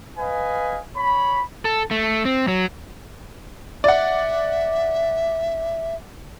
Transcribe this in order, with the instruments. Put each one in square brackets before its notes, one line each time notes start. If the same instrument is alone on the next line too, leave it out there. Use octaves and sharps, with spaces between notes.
[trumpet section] B4 D#5 F5 G#5
C#5 B5
[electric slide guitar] A4
A3
C4
F#3
[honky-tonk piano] D5 F#5 [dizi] E5